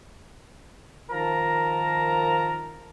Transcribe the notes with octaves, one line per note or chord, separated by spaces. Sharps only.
D#3 F3 A#4 A5 A#5